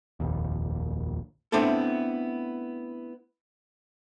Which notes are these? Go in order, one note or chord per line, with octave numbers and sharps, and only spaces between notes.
F1 A#1 D#2
A3 B3 C4 D4 E4 A4